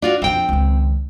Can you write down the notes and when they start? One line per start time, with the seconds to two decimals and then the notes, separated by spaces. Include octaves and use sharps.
0.02 D4 F4 F#4
0.22 F2 C4 D4 G5
0.49 C#2 D#3